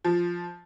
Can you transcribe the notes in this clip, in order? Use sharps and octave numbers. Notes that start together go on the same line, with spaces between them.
F3